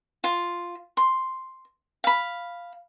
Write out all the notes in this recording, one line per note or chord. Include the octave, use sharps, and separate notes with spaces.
F4
C6
F5 B5